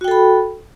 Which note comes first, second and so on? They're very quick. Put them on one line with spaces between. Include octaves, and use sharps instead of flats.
F#4 G5 A4 B5